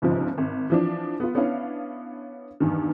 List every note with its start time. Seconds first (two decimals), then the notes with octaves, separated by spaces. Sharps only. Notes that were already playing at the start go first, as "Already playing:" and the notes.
0.02 G1 C#2 G#2 C3 F3
0.38 G#1
0.70 E3 F3 D4
1.20 B3 F4
1.35 B3 C#4 D4 E4 F5
2.60 E2 G2 D#3